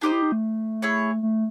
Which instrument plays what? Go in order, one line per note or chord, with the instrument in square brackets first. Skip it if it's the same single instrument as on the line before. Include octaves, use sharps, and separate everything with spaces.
[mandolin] D4 G4 C5 D#5 [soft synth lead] D#4
[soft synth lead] E4
D#4
A3
[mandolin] E4 G#4 C#5
[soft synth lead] A3